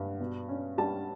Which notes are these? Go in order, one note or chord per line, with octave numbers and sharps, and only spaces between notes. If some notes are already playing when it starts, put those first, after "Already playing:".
Already playing: G2
B2
C#4
G3 A5